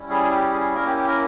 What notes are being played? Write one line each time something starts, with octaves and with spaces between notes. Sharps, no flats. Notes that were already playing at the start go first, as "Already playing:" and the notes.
Already playing: G3 C#4 E4
G#4
G4
G#4
A#3 C#4 E4 A#4
G4
G4
A#4